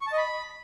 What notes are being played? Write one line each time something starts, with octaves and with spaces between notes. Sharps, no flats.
C#6
A5
D#5
B5